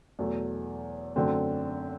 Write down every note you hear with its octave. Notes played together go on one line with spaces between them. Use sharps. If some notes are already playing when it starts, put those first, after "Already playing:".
E2 B2 F#3 A3
F#2 D3 F#3 A3 C4